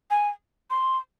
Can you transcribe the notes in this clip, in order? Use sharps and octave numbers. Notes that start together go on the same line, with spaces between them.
G#5
C6